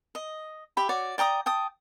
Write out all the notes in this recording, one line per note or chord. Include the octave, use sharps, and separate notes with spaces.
D#5
G4 E5 B5
F#4 C#5 D5
D5 G5 A#5 D#6
G5 A5 D#6